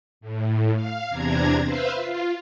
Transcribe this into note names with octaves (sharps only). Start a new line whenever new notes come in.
A2
F5
E2 C3 D4 A#5 G#6
B4 C5 E5 F5
F4